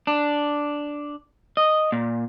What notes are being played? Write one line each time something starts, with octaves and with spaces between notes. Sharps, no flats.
D4
D#5
A#2